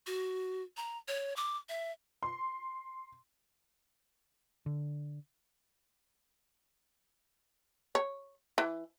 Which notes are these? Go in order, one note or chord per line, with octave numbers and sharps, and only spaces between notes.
F#4
A#5
C#5
D6
E5
C6
D3
C#5
E3